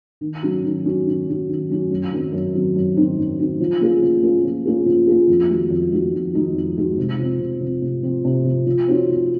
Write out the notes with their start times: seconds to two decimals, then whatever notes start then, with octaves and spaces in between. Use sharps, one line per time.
0.21 D#3
0.42 F#3 C#4 F#4
0.64 D#3
0.85 F#3 C#4 F#4
1.06 D#3
1.27 F#3 C#4 F#4
1.48 D#3
1.69 F#3 C#4 F#4
1.90 F#2
2.12 D#3 F#3 C4 D#4
2.32 F#2
2.54 D#3 F#3 C4 D#4
2.75 F#2
2.96 D#3 F#3 C4 D#4
3.17 F#2
3.38 D#3 F#3 C4 D#4
3.60 F3
3.81 A#3 C#4 F4 G#4
4.02 F3
4.22 A#3 C#4 F4 G#4
4.44 F3
4.66 A#3 C#4 F4 G#4
4.86 F3
5.07 A#3 C#4 F4 G#4
5.28 F2
5.49 D#3 G#3 D#4 F#4
5.70 F2
5.91 D#3 G#3 D#4 F#4
6.13 F2
6.33 D#3 G#3 D#4 F#4
6.55 F2
6.76 D#3 G#3 D#4 F#4
6.97 C3
7.19 F3 C4
7.40 C3
7.61 F3 C4
7.82 C3
8.03 F3 C4
8.25 C3
8.45 F3 C4
8.66 F3
8.88 C4 D#4 F#4 C#5
9.09 F3